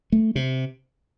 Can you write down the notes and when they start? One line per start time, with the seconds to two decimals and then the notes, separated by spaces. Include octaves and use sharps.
0.12 A3
0.35 C3